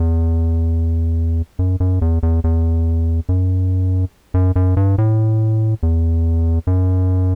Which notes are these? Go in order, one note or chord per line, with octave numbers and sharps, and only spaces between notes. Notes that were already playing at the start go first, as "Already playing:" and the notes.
Already playing: E2
F#2
F#2
E2
E2
E2
F#2
F#2
F#2
G2
A2
E2
F#2